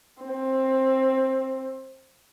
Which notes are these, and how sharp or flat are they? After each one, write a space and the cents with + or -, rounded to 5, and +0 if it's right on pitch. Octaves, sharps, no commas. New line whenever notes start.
C4 +15